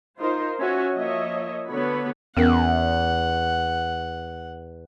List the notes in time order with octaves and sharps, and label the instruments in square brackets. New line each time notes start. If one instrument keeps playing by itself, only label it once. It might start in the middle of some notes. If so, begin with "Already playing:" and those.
[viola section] D#4 F4 A#4 C5
C#4 F#4 C#5 E5 G#5
F3 A#3 C#5 D#5 E5
D3 B3 F#4 C#5 B5
[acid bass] E2 [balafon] B3 C#4 A#4 [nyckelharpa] F#5